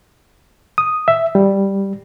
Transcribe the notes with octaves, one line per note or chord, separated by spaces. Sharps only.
D#6
E5
G3